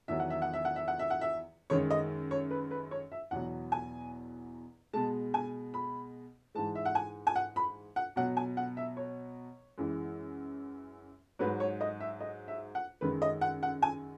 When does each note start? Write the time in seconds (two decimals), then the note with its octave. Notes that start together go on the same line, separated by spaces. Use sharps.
0.08 E2 D#3 F#3 E5
0.20 F#5
0.30 E5
0.42 F#5
0.53 E5
0.65 F#5
0.76 E5
0.88 F#5
0.99 E5
1.10 F#5
1.21 E5
1.70 F#2 D#3 G#3 C#5
1.91 D#5
2.31 C#5
2.51 B4
2.71 B4
2.91 C#5
3.12 E5
3.31 E2 B2 F#3 F#5
3.72 G#5
4.93 B2 G#3 A5
5.34 G#5
5.74 B5
6.55 G#2 E3 G#3 A5
6.75 E5
6.85 F#5
6.95 G#5
7.27 G#5
7.36 F#5
7.56 B5
7.96 F#5
8.16 B2 F#3 F#5
8.37 G#5
8.57 F#5
8.77 E5
8.97 C#5
9.78 F#2 E3 G#3
11.39 G#2 F#3 B4
11.60 C#5
11.81 D#5
12.00 E5
12.21 D#5
12.48 E5
12.75 F#5
13.01 F#2 D#3 G#3 B4
13.22 D#5
13.41 F#5
13.63 F#5
13.82 G#5